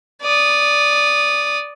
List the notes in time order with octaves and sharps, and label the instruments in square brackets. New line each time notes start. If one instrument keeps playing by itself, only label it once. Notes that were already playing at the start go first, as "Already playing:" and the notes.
[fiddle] D5 D#6